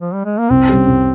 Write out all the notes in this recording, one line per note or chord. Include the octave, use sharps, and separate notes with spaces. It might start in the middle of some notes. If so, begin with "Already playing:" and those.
F3
G3
G#3
A#3
C2 C4
C3 G3 C#4 G4
C2